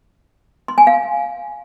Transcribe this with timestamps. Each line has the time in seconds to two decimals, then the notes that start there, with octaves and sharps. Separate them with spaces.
0.68 C6
0.78 G#5
0.87 F5